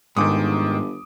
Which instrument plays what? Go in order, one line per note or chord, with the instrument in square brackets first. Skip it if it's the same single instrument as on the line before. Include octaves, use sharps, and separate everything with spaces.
[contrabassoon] G1 [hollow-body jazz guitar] G#2 [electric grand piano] D#3 D6 D#6